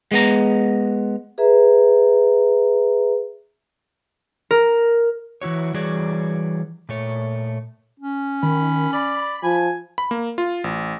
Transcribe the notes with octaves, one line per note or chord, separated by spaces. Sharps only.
G#3 B3 A#5
G#4 B4 E5 A#5
A#4
E3 E4 F#4 C#5
E3 G3 F#4 G#4 C#5 D5
A#2 A3 C#5
C#4
D#3 B5
D5 B5
F3 G#5
B5
A#3
F4
A1